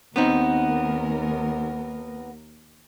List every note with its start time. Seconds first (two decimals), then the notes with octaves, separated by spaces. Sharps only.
0.16 D#2 B3 C4 D#4 A#4